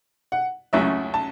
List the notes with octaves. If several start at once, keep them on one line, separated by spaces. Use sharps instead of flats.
F#5
C#2 C#3 F#3 A3 E4 E5
A5